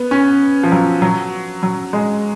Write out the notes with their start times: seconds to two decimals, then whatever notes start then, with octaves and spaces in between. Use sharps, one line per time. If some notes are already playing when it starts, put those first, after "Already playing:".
Already playing: B3
0.11 C#4
0.63 F3
0.72 F#3
1.02 F#3
1.63 F#3
1.93 G#3